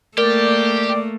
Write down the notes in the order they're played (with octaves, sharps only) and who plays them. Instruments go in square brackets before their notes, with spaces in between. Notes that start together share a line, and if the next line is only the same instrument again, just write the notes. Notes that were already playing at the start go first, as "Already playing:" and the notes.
[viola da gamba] A3 A#3 [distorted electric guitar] G4 [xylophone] A#4 [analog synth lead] D5